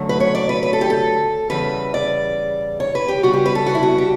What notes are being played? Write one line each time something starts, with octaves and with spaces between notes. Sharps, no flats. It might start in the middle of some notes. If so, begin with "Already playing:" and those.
Already playing: F#2 D3 F#3 A3
B4
C#5
D5
B4
B4
A4
G4
A4
E2 C#3 E3 G3 B4
D5
C#5
B4
G4
C#3 G3 B3 F#4
G4
B4
A4
F#4
E4
F#4
G4